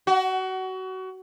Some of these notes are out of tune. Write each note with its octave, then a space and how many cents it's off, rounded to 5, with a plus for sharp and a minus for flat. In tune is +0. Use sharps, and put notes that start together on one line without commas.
F#4 +25